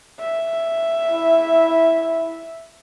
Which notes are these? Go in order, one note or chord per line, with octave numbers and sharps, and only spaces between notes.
E5
E4